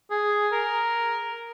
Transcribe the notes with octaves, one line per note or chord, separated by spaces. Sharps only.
G#4
A#4